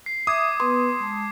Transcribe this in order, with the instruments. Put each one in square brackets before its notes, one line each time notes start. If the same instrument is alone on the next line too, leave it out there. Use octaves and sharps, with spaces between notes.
[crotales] C7
[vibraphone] E5 [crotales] D6 G#6 [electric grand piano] D#6
[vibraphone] B3 B4 [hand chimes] C6
[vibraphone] G#3 A5